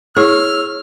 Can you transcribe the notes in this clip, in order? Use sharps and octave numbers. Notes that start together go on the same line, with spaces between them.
E4 G#4 C#5 E6 F6